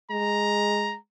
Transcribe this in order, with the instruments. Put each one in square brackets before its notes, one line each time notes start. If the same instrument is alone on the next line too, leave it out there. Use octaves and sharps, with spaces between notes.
[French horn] G#3 [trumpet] A#5